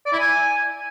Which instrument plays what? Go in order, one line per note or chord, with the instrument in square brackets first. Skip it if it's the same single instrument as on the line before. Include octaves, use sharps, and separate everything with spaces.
[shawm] D5
E4
G#5